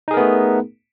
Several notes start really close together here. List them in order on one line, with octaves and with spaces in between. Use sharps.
D#4 G#4 A#4 B3 A3